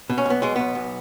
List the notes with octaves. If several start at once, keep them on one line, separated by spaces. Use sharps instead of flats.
B2
C#4
B1 B3
B2 G#3
B1 B3
B1